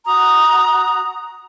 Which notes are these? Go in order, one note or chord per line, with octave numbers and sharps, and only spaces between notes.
F#4 A#5 D#6